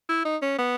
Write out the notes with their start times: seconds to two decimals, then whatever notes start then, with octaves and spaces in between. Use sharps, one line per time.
0.09 E4
0.25 D#4
0.42 C#4
0.59 B3